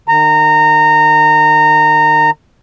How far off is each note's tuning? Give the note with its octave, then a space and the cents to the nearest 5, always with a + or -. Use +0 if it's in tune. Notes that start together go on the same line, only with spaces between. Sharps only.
D#3 -35 A#5 -20